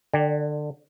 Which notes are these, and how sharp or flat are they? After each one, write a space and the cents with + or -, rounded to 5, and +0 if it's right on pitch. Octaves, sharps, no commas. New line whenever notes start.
D3 +25 D5 +0 G5 +0